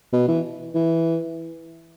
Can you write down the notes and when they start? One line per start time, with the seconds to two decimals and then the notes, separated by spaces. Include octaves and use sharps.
0.13 B2
0.28 E3
0.75 E3